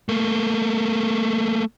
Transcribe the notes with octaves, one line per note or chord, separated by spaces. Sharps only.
A3 A#3